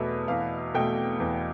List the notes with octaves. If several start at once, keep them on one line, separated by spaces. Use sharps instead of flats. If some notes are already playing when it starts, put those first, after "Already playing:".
Already playing: E2 B2 A3 B4 E5
E2 F5
B2 A3 G5
E2